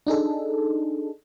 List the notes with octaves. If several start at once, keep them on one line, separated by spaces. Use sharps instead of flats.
D4 D#4 G#4 A4